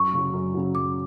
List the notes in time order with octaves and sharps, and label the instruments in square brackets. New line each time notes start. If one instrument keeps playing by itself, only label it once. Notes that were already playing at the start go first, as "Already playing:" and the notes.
Already playing: [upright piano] F#2 [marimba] C#6
[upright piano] C#3 F#3
F#2
C#3 F#3
[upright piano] F#2 [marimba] D6